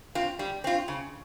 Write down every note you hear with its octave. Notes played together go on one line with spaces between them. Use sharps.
C4 F4
G3
C4 F4
C#3